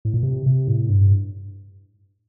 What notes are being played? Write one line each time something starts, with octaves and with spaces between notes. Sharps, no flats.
A2
A#2
C3
C3
A2
G2